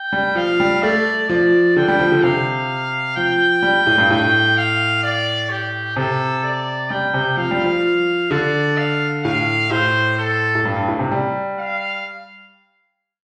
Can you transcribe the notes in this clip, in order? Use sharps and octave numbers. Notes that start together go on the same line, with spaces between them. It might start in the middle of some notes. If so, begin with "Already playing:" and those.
Already playing: G5
G3
F3 F5
G3
A3 D5
F3 D5
D3 G5
G3
F3
D3
C3 F5
F3 G5
G3
A2
G2
A2 G5
F5
D5
G4
C3 A4
D5
G3 G5
C3
F3 F5
G3
F3
D3 D5
F5
A2 F5
A2 C5
A4
A2
G2
G2
A2
C3
G3
F5